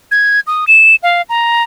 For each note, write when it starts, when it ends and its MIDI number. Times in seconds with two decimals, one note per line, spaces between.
0.11 0.40 92
0.47 0.65 87
0.68 0.95 100
1.03 1.22 77
1.29 1.63 82